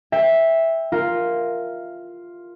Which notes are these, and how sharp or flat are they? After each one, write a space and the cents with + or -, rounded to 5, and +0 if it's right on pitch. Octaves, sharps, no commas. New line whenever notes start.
E5 -5 G5 +25
F4 +0 A#4 +0